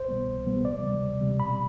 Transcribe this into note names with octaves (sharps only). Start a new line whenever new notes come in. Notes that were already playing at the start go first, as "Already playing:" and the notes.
Already playing: C2 C5
B2 G3 B3
C2
B2 G3 B3
D2 D5
C3 G3
D2
C3 G3
B2 B5